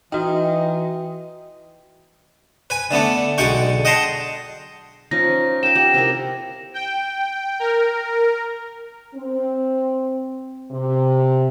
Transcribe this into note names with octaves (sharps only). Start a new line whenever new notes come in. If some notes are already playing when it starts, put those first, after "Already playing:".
E3 D#4 F#4 D#5 G5
B4 G#5
D3 A3 B3 D4
B1 D3 G#3 F#5 G5 C#6
D#5 F#5 G5 A5 A#5 C6
F3 C#4 D#4 A#6
F5 G5 E7
G4 F#5
C3 E4 A#4
G5
A#4
C4
C3